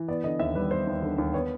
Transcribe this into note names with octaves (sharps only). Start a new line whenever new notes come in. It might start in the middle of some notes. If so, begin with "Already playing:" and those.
Already playing: E3
B3 D5
D3 D#5
D#2 E5
G3 B4
B3 C5
D#2
D3
D#2
B3 C#5